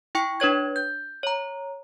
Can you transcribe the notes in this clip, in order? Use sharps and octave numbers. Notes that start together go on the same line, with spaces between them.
E4 G5 C#6 C#7
D4 B4 C#5 G#6
G6
C#5 A#5